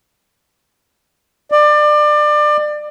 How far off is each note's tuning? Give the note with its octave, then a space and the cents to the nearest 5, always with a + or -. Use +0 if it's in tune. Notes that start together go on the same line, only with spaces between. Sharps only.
D5 +25